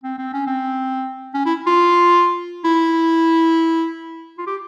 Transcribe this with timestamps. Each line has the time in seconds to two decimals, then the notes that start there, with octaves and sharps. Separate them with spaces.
0.04 C4
0.18 C4
0.33 C#4
0.47 C4
1.35 C#4
1.46 E4
1.67 F4
2.65 E4
4.38 F4
4.47 G4